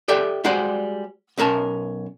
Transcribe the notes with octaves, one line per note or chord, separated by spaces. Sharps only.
G4 A4 D5 E5 G5
G3 G#3 F#4 G4 C5 D5
B1 C#4 A#4 A5